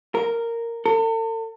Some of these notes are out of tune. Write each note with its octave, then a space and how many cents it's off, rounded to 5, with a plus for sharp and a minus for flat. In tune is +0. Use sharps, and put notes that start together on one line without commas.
A#4 -5
A4 +40